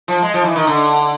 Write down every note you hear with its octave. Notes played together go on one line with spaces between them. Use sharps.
F3
G#3
F3
E3
D#3
D3